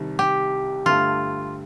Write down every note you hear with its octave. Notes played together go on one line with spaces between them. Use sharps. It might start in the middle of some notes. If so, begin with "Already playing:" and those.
Already playing: C2 C3 D#3 G3
G4
G2 D3 A3 F4